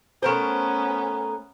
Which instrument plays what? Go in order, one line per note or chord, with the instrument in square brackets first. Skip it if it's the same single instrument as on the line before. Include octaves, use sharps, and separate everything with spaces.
[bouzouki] A3 A#4 C5 [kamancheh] B3 C#4